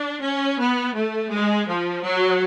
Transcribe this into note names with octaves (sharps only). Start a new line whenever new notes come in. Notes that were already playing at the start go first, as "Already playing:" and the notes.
Already playing: D4
C#4
B3
A3
G#3
F3
F#3